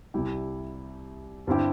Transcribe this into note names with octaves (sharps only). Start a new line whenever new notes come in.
C2 C3 G3 E4 G4
G2 D3 C4 E4 G4